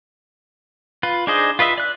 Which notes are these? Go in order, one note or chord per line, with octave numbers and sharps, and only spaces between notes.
F4 B4
D4 D#4 G#4 C5 D#5
F4 B4 D#5 E5
D5 F#6